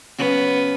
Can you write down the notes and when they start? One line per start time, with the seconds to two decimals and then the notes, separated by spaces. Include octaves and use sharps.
0.18 C#3 F#3 B3 C#4 F#4